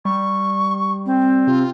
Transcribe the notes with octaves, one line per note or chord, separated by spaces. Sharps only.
G3 C#6
C4
C3 F4